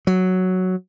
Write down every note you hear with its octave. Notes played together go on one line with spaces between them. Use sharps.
F#3